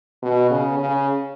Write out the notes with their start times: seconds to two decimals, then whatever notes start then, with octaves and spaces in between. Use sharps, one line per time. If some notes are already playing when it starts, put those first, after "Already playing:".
0.23 B2
0.51 C#3
0.79 C#3